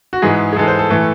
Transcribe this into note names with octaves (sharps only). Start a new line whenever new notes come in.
F#4
G#2 E3 G#3 G#4
G#4
G#2 E3 G#3 A4
C5
A4
A2 E3 A3